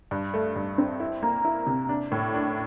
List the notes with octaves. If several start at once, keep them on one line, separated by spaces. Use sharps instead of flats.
G2
A3
G2
C4
E4
A#3
E4
C3
D4
A2
D4